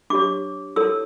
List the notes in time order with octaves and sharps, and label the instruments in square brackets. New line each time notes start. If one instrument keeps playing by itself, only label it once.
[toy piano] D4 G4 C#5 D6
E4 A4 C#5 E6